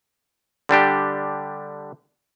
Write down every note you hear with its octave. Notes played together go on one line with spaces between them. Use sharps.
D3 G3 D4 G4